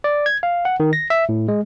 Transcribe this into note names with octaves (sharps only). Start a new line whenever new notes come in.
D5
G#6
F5
F#5
D#3
A#6
E5
A2
G#3